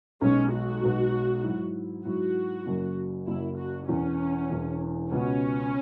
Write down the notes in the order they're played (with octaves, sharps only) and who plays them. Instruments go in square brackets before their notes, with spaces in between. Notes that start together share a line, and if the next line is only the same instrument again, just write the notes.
[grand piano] B1 B2 G#3 [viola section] C#4
[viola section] F#4
[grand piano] B1 B2 G#3
G#2 F#3 E4
[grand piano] G#2 F#3 E4 [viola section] F#4
[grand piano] F#1 F#2 F#3
[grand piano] F#1 F#2 F#3 [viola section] E4
[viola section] F#4
[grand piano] E1 E2 E3 [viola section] C#4
[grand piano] E1 E2 E3
[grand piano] C#2 B2 B3 F#4 [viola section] C#4